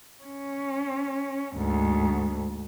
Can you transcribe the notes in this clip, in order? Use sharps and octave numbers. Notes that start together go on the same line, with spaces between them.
C#4
D2 G#2